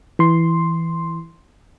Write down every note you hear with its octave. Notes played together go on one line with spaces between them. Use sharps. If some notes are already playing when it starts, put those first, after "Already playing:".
E3 C6